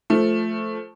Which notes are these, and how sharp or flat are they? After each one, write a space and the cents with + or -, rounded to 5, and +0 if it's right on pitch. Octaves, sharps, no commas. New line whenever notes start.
F3 +0 A3 +0